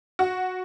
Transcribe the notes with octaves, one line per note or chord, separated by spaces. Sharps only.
F#4